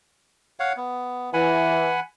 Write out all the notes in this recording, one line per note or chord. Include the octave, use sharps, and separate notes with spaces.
C#5 F5 F#5
B3
E3 F#5 G#5 B5